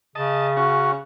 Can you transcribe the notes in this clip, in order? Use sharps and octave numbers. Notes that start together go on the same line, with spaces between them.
C#3 D#5 A5
C#4 F#4